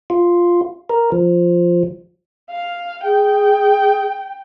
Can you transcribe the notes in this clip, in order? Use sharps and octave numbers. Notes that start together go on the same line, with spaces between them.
F4
A#4
F3
F5
G#4 G5